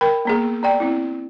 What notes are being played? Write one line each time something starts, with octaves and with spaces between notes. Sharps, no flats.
A#4 G5 B5
A#3 B3 G#4
B3 D5 G5
C4 E4